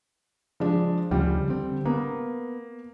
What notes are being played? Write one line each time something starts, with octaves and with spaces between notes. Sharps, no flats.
F3 G#3 D4
D2 C#3 F3 G3
D3 C4
A#3 B3